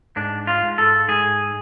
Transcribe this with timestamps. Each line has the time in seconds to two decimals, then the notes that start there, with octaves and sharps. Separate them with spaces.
0.16 G#2 D4
0.47 F4
0.63 G#2
0.78 A4
1.08 G#2 G#4